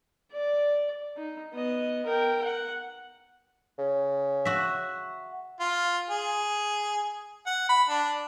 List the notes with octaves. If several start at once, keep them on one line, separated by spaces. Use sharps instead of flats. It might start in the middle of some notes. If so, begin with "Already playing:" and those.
D5
D#4
B3 D#5
A#4 G5
F#5
C#3
F#4 E5
F4
G#4
F#5
B5
D4